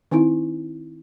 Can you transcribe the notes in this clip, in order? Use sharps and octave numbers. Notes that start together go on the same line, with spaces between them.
D#3 C4 D#4 E4